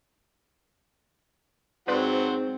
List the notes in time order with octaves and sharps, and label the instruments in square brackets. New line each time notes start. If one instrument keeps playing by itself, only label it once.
[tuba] G#2 [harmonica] F#3 C5 F#5 [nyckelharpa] C4 [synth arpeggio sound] B4 D5 C6